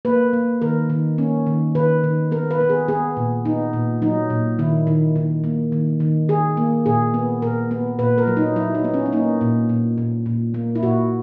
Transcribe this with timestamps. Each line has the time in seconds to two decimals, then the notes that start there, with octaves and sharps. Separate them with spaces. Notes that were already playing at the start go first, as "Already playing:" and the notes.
0.05 A#3 B4
0.33 A#3
0.62 D#3 A#4
0.90 D#3
1.18 A#3 C#4
1.47 D#3
1.75 D#3 B4
2.04 D#3
2.31 B3 A#4
2.51 B4
2.61 B3
2.70 G#4
2.88 B3 G#4
3.17 A#2
3.45 B3 D#4
3.73 A#2
4.02 F#3 D#4
4.30 A#2
4.59 D#3 E4
4.87 D#3
5.16 D#3
5.44 A#3
5.72 D#3
6.00 D#3
6.29 D#3 G#4
6.57 A#3
6.86 A#2 G#4
7.14 B3
7.42 A#2 A#4
7.71 B3
7.99 A#2 B4
8.18 A#4
8.27 F#3
8.37 D#4
8.56 F#3 E4
8.75 D#4
8.84 B3
8.94 C#4
9.06 C#4
9.12 A#3 D#4
9.41 A#2
9.69 A#2
9.98 A#2
10.26 A#2
10.54 A#3
10.75 E4
10.83 A#2 F#4